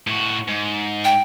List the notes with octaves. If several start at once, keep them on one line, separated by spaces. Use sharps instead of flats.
A2 F#4
G#2
G5